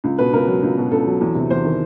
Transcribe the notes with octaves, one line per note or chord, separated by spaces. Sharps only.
C#2
B2 B4
C#2 A#4
F#3
C#2
B2
C#2 A4
F#3
E2
C3
E2 C5
D#3